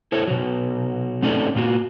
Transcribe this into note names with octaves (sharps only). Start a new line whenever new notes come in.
E4 A4 C5 C#5
B2 F#3
A3 C4 C#4 D#4 A4 D5
A#2 A#3 F4 F#4